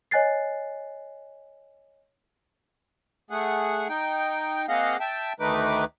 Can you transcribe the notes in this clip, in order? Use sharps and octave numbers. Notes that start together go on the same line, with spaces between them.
C#5 D#5 G#5 F#6 A6 C7
A3 G#4 F#5
D#4 G5
A#3 C4 G#4 D#5 F5 F#5
E5 G5 A5
D2 D#3 A3 D#4 B4 D6